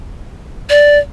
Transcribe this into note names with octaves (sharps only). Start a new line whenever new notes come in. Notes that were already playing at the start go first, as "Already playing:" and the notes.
D5